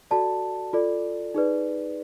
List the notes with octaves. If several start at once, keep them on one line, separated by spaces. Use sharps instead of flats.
F#4 A4 D5 A5
F4 A4 D5
D#4 G#4 B4 D5